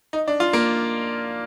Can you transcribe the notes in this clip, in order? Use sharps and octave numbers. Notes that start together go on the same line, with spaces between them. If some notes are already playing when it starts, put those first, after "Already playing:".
D#4
D4
F4
A#3